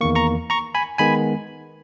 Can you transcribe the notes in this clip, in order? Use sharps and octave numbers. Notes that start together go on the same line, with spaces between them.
E2 D#3 A#3 C#6
A#5 C#6
A#5 C#6
G#5 B5
D#3 G#3 B3 G#5 B5